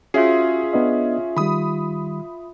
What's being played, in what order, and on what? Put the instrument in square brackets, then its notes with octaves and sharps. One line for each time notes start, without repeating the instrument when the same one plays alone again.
[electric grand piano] C#4 G#4 [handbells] F4 E5 C7 [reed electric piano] F#4
[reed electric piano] B3 D4 D#5
[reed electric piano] D#3 G3 [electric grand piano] B5 D#6